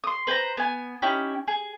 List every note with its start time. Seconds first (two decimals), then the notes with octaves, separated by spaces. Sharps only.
0.04 C6 D#6
0.27 B4 C5 G5 A#5
0.57 B3 G#5
1.02 C#4 D#4 E4 G4
1.48 G#4